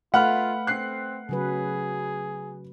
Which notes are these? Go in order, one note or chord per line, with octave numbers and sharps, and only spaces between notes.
A3 F4 B4 F5 F#5 B5 F6
C4 F#6 C7
C#3 F#3 G#4 B4